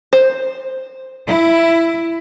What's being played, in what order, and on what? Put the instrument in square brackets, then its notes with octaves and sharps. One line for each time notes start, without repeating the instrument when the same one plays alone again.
[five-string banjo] C5
[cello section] E4